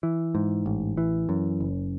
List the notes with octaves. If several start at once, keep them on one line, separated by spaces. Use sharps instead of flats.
E3
G#2
A1
E3
F#2
F#1